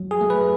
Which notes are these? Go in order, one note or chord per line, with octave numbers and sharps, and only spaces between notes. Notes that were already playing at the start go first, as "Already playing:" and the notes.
Already playing: F#3
G#4
A3
B4